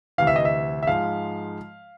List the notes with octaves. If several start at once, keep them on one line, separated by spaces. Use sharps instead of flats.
D2 C3 E3 F5
E5
D#5
E5
E5
G#2 F3 G#3 F5